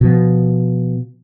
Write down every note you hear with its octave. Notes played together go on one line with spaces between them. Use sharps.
B2 F3